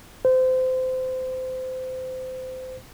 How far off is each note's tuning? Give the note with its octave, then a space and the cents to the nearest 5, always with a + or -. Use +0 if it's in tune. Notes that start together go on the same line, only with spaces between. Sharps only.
C5 -25